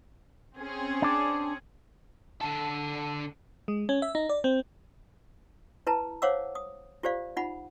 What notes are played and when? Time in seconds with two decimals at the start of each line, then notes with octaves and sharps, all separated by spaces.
0.58 C4 C#4 G#4
1.02 D4 D5
2.41 D3 A4
3.68 G#3
3.89 C#4
4.02 E5
4.15 D#4
4.29 D5
4.44 C4
5.87 E4 B4 A5 A#5
6.22 C5 C#5 F5 F#5 D6 E6
6.55 D#6
7.03 F4 G4 C5 D5 F5
7.37 D#4 F4 F#5 B5